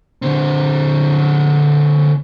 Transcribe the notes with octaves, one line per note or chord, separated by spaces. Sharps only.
D3 C4